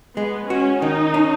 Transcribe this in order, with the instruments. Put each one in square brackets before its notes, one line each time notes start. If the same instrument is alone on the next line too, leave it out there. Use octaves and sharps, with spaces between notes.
[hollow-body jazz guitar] G#3 [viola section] B3
[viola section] C#4 [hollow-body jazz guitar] F#4
[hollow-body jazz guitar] D#3 [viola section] D#4
[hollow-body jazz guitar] C#4